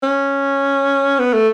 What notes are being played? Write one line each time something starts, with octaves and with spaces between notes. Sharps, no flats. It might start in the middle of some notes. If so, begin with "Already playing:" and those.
C#4
B3
A3